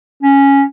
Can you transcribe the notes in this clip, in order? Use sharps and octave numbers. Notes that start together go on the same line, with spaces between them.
C#4